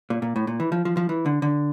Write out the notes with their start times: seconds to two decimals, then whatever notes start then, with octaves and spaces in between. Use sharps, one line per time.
0.10 A#2
0.22 A#2
0.36 A2
0.47 A#2
0.60 E3
0.72 F3
0.85 F3
0.97 F3
1.09 E3
1.26 D3
1.42 D3